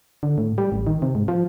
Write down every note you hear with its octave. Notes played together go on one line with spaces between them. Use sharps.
D3
A2
G3
A1
D#3
C3
G#2
F3